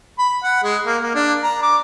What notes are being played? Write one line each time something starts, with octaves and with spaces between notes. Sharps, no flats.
B5
F#5
G#3
A#3
A#3
D4
A#5
D6